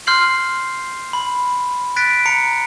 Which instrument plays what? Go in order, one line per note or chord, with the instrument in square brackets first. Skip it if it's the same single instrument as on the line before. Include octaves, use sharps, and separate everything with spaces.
[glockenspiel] C6 F6 G6 C7 F#7
B5
F#6 A6 B6 D7
A#5 C#7